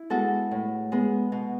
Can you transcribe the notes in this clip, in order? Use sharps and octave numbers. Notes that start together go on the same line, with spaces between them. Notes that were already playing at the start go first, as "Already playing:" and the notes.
Already playing: E4
G#3 B3 F#4 A4
A2
G#3 B3
B2